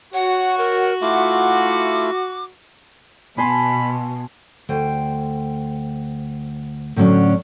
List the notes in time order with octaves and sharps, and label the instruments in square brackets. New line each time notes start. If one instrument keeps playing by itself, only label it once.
[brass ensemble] F#4 [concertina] C#5 [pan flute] F#5
[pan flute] A#4 [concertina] C#5 F#5
[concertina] A3 E4 F4 [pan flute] D6
[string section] B2 [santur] G#5 A5 C6 [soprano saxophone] B5
[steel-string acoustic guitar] D2 C5 G5
A2 D3 F#3 C#4 D4